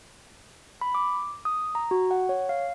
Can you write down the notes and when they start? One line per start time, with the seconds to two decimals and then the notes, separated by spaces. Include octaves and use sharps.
0.81 B5
0.95 D6
1.45 D#6
1.75 A#5
1.91 F#4
2.11 F#5
2.29 C#5
2.49 F5